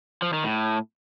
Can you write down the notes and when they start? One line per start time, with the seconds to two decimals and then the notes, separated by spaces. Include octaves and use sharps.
0.22 F3
0.33 D#3
0.44 A2